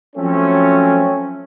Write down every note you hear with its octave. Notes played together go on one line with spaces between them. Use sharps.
F3 F#3 A3 C4 C#4